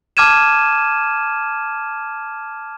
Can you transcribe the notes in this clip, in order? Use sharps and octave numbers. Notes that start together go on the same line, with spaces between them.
A5 D6 F6 G#6 D#7 E7